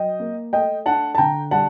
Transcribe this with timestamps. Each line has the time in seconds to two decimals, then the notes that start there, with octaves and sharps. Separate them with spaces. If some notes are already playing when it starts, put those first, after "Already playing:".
Already playing: F#3 D#5 G5
0.20 A#3
0.53 A3 D#5 G5
0.86 D4 F#5 A5
1.15 A5
1.18 D3 G5 A#5
1.51 G3 F#5 A5